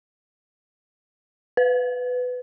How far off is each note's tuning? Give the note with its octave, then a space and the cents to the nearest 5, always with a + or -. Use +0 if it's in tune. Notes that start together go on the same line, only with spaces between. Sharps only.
B4 +15